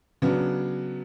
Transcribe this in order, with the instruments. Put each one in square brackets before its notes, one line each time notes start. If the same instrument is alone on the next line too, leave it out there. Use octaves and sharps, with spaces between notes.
[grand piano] C#3 F#3 B3 D4